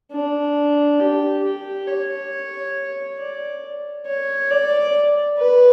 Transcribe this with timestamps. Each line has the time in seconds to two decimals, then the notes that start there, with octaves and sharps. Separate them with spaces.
0.12 D4
1.00 G4
1.44 G4
1.87 C#5
3.20 D5
4.07 C#5
4.51 D5
5.38 B4